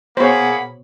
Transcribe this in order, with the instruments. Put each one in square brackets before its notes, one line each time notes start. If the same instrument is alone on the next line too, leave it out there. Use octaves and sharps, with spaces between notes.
[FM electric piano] B2 [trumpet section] A#3 B5 [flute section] G#4 F#5 [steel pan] C5 C#5